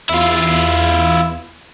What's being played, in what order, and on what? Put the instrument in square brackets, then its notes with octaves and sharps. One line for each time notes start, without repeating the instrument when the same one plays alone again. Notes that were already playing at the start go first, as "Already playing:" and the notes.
[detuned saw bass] E2 [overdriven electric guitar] E4 F4